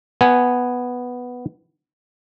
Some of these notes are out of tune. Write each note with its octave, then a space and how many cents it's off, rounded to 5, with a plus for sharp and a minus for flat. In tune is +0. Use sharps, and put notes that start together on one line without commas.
B3 +0 G#5 +0